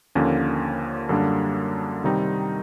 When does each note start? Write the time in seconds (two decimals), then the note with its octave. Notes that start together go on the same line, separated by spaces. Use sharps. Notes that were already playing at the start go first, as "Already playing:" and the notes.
0.15 D#2 D3 F3 A#3 C#4
1.09 F#2 D3 G3 A#3 D4
2.04 C3 D#3 G3 C4 D#4